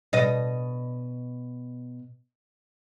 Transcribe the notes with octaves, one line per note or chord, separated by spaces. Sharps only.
B2 D#5